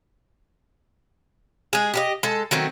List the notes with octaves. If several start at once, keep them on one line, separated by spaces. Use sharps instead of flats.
G#3 G#4
G4 A4 D#5
G#3 A4
D#3 F#3 A3 C4